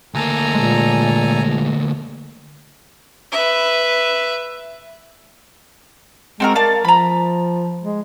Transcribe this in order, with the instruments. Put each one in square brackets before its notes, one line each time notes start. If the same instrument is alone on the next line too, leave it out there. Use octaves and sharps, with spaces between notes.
[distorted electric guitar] D2 A#3 [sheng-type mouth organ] A4 G#5 A#5
[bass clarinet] A#2 [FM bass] G#3
[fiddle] B4 E5
[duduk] G#3 [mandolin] C4 F#4 A#4
[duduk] A#4 [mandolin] D5 F5 A5
[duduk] F3 [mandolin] A#5 B5
[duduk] G#3